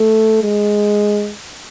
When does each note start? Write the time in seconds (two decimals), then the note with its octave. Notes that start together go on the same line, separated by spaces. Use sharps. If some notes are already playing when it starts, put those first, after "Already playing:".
Already playing: A3
0.43 G#3